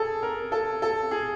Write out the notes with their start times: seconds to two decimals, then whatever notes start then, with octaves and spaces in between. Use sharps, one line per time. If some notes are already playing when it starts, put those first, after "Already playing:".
Already playing: G#4 A4
0.23 A#4
0.52 A4
0.82 A4
1.11 G#4